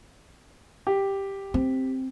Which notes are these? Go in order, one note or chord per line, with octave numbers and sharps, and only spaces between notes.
G4
C4